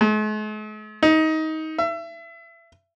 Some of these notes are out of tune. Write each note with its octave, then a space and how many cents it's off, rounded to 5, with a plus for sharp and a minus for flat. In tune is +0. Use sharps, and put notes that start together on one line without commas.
G#3 +45
D#4 +20
E5 +30